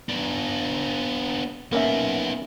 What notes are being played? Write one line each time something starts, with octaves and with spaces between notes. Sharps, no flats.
B3 D4
A#3 B3 C#4 D#4 E5